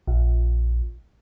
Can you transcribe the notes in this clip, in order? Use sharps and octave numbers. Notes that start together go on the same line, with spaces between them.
A#1